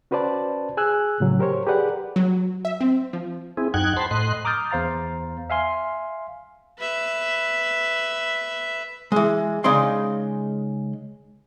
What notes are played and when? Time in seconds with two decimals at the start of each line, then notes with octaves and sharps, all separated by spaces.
0.11 C#4 F#4 B4 C5 D5 A5
0.77 G#4 G#5 E6 F#6
1.20 A2 C#3 F#3
1.39 G4 A#4 C5 C#5
1.67 G4 G#4 A#4 B4 D5 F#5
2.16 F#3
2.65 E5
2.81 C4
3.13 F3
3.57 C4 E4 G#4
3.74 F#2 D#4 F#5 G5 F#6 G#6
3.96 C5 A5 B5 C6
4.11 A2 D#5 C6 F#6
4.45 A#5 D6 D#6 F6 G6 A6
4.71 E2 C5 F5 A#5 A6
5.50 E5 F5 G#5 C6
6.79 B4 E5
9.12 E3 G#3
9.64 C#3 G#3 D#4 D5 C6